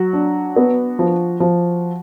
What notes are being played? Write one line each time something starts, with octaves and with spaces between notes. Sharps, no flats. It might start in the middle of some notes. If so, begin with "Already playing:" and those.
Already playing: F#3 F#4
D4
B3
F3
F3